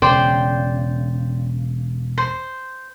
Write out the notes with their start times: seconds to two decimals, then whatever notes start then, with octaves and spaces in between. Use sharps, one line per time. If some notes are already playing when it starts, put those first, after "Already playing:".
0.02 E1 C#3 C5 D5 G5
2.18 C5